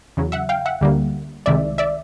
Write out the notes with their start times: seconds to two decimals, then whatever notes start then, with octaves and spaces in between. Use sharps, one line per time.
0.17 E2 C#3 F#3
0.32 E5 F#5
0.49 F5 G5
0.66 E5 F#5
0.81 D2 D3 G3 A#3
1.46 C2 C3 D#3 G#3 D5 E5
1.78 D5 E5